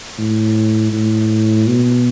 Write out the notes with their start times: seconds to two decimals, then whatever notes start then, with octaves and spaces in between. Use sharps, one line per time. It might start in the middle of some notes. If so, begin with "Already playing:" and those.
0.18 A2
0.93 A2
1.67 B2